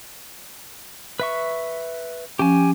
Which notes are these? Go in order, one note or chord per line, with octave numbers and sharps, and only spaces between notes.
B4 E5 C#6
F3 C#4 G4 G#5